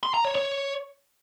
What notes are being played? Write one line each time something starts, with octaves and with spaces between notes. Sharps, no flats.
C6
A#5
C#5
C#5